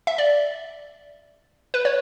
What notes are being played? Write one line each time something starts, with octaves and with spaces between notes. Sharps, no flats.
E5
D5
B4
C#5